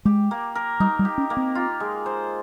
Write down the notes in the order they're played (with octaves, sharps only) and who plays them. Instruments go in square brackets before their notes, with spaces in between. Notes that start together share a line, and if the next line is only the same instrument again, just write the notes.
[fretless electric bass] G#3 [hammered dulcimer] G4
[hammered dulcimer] A#3
A#4
[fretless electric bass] G3 [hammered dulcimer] D#4
[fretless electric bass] G3
[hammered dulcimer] G4
[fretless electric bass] C#4
[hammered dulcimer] A#3
[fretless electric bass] C4
[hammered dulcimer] F4
G#3
C5